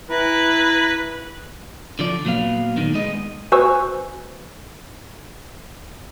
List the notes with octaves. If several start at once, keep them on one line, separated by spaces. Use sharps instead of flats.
E3 E4 B4 A#5
D3 F3 D5
A#2 F#3 B3 F5
A#2 D3 D#3
G#3 B3 D#5
F#4 B4 C5 G#5 C#6 E6